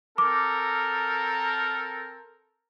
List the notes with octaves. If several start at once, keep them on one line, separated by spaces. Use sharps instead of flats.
C4 A4 A#4 D6